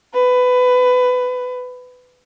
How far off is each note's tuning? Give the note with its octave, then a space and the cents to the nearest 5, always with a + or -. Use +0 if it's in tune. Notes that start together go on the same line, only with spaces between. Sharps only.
B4 +20